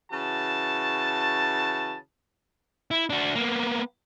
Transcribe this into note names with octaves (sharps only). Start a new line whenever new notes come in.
C#3 E3 F#4 A5
E4
D4 F#4
A#3 B3